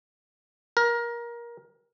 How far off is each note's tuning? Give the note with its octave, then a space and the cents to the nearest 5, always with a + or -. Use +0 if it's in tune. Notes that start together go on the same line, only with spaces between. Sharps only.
A#4 +20